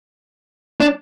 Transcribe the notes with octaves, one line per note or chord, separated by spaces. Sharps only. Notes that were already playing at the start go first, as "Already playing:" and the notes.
D4